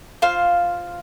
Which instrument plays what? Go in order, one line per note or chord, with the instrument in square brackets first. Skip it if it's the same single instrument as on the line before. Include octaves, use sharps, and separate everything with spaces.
[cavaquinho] F4 C5 F5